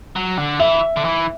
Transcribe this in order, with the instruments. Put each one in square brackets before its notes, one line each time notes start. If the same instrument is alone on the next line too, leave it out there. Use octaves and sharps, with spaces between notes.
[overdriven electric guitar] F#3
D3
[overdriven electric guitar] E3 [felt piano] E5
[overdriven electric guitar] D3
E3